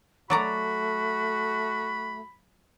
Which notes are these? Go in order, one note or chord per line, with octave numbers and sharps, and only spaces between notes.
F#3 A3 F#4 D5 A#5 B5